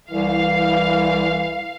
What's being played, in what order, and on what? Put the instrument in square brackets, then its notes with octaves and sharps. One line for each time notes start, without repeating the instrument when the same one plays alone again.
[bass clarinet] C2 [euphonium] E3 [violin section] F5